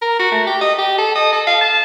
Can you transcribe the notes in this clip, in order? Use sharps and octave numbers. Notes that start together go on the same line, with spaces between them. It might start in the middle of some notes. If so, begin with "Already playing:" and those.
A#4
F#4
A3
G4
D#5
G4
A4
D#5
A4
F5
A5